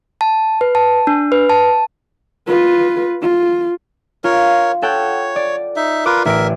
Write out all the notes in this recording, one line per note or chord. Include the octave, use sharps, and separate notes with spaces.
A5
B4
A5
D4
B4
A5
F4 B4
F4
F4 A#4 C#5
A4 C#5 F#5 G5
D5
D#4 E5
F4 A#4 B4 D6
A1 A#4 E5 D7